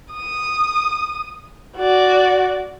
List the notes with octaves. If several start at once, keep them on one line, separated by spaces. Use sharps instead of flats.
D#6
F#4 D5